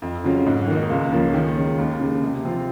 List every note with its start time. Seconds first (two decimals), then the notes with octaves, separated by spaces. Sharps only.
0.02 F2
0.24 C#3 F#3 C#4 F4
0.46 G#2
0.67 D#3 A#3 D#4
0.90 C#2
1.12 C#3 F3 A#3 C#4
1.34 D#3
1.56 G#3 C#4
1.78 D#2
1.99 C#3 G#3
2.22 C3
2.44 F3 C4 F4